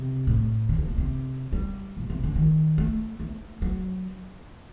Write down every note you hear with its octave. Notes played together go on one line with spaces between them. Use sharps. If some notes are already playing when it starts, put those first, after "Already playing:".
Already playing: C3
A2
D3
C3
A#2
C3
G3
A#2
C3
D3
D#3
A3
A3
F#3